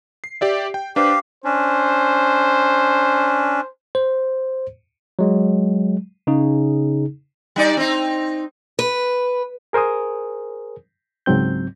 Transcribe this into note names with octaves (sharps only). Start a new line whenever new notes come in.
C7
G4 D5 E5
G5
D4 G4 B4 C5 F5
C#4 D4 C5
C5
F#3 G#3
C#3 D#4 G#4
G3 D#4 D5
C4 D#4
B4
G#4 A#4 C5 G#5 D#6
C#2 G#2 F#3 C4 G6